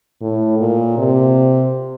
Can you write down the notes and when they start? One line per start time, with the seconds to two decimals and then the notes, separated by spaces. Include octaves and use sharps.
0.21 A2
0.59 A#2
0.97 C3